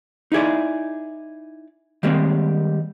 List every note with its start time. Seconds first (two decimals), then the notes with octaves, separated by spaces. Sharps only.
0.32 D#4 E4 G#4 D5
2.03 D#3 G3 G#3 A#3 C4